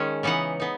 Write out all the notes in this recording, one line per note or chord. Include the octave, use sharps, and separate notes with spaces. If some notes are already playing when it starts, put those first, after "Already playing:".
Already playing: D#3 G#3 C#4
C#3 E3 B3 D#4 F#5
B3 D#4